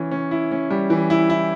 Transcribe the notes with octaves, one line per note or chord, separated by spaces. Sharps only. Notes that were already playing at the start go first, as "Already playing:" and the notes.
Already playing: E3 C#4
C#4
E4
C#4
G3
E3
E4
E4